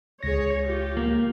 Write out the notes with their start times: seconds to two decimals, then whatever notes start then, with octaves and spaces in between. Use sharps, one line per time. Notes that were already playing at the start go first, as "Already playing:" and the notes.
0.23 C#2 G#4 C#5 A#6
0.64 F4 G4
0.97 A#3